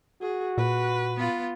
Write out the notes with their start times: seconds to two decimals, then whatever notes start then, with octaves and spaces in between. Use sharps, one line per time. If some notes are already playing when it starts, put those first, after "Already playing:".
0.22 F#4 G#4
0.58 A#2 B4
1.16 B3 F4